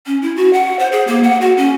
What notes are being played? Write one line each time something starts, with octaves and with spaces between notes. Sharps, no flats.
C#4
E4
F#4
F#5
C5
G#4
A#3
F#5
F#4
C#4